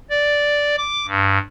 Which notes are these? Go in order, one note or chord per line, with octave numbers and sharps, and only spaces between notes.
D5
D6
G2